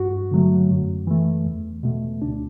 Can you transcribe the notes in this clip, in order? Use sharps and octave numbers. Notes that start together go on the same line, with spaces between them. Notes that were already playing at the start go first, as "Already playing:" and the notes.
Already playing: G2 F#4
D3 F#3 A3
F#2
E3 A3
E2
B2 A3
D2 D4